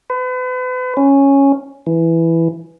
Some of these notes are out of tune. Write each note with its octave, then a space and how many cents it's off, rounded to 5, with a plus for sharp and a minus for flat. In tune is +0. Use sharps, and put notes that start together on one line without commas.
B4 +40
C#4 -5
E3 +5